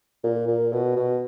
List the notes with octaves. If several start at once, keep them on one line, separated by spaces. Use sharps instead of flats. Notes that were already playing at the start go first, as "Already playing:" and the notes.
A#2
A#2
B2
B2